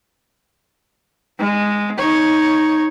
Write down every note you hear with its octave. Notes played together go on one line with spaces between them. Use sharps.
G#3
D#4 C#5